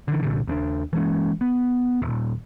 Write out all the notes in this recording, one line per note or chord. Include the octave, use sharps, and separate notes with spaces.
D3 E3
C2 A#2 D3
D#2 B3 D4
E3 G#3 C#4
B3
D#1